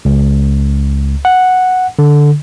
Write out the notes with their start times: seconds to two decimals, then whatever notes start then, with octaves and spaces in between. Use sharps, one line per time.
0.05 C#2
1.25 F#5
1.99 D3